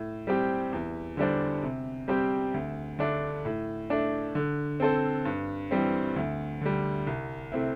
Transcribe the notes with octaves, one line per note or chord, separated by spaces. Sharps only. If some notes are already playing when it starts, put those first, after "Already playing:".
Already playing: A2
G3 C4 G4
E2
D3 G3 D4 C5
C3
G3 C4 G4 C5
D2
D3 A3 D4
A2
A3 D4
D3
C4 A4 C5
G2
E3 G3 C4
D2
D3 G3
C2
C3 A3 C4 E4